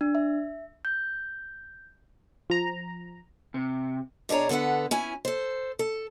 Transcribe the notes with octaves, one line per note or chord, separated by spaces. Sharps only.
D4
E5
G6
F3 A#5
C3
B2 D4 G#4 C#5 A#5
D3 B3 A4 B4 F#5
C#4 E4 G#5
A4 C5
A4